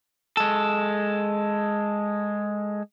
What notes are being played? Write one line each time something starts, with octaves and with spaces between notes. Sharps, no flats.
G#3 A4